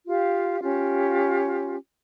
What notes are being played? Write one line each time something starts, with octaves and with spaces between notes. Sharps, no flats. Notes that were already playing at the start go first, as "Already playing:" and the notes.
F4 G4 F5
C#4 F4 G4